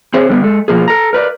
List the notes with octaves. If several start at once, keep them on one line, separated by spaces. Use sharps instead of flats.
C4 G#4 C5 C#5
D3 G3 B3
G#3 A4
B2 F3 A#3 G#4
A4 A#5
A#4 B4 D5